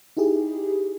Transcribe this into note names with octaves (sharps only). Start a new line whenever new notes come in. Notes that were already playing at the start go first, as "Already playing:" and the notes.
D#4 E4 G4 G#4